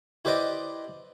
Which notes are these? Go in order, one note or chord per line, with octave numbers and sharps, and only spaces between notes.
E4 G4 B4 C5 D5 D#5